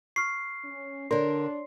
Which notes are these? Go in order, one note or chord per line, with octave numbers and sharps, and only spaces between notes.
C#6 F6 C7
C#4
D3 D4 A#4 C#5 D5 C6